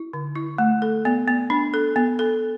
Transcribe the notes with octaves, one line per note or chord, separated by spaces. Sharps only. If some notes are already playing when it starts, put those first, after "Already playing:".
Already playing: E4
D3
E4
A3
A4
B3
B3
D4
A4
B3
A4